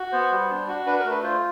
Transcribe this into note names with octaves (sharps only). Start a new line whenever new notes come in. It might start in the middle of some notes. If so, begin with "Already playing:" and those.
Already playing: F#4
B3 C5
G3
D4
F#4
D4 B4
A#4
A3
B4
F4 C5